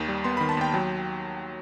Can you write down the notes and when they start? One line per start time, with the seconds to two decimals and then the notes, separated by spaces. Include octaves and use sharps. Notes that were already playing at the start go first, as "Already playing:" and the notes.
Already playing: D#2 D#3
0.08 G3
0.24 B3 C6
0.37 B5
0.40 D#3
0.49 A5
0.57 D#2 G5
0.74 F#3 G5